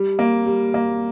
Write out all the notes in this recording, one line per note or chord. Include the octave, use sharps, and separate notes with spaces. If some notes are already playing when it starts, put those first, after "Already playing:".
Already playing: G3
A#3
G3
A#3